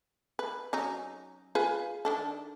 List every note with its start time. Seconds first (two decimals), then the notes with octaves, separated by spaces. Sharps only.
0.39 B4
0.73 F#3 C#4 D#4
1.55 F4 G#4 B4
2.05 D#3 D4 A4